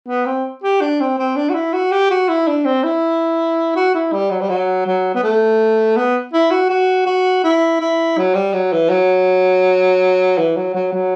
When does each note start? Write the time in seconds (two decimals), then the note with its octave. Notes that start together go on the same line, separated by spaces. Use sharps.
0.08 B3
0.26 C4
0.64 G4
0.81 D4
1.00 C4
1.18 C4
1.36 D4
1.50 F#4
1.54 E4
1.73 F#4
1.92 G4
2.11 F#4
2.29 E4
2.47 D4
2.65 C4
2.84 E4
3.76 F#4
3.94 E4
4.12 G3
4.31 F#3
4.41 G3
4.49 F#3
4.86 F#3
5.14 B3
5.23 A3
5.97 B3
6.34 E4
6.51 F#4
6.70 F#4
7.06 F#4
7.44 E4
7.80 E4
8.18 F#3
8.35 G3
8.54 F#3
8.73 E3
8.90 F#3
10.38 E3
10.57 F#3
10.74 F#3
10.92 F#3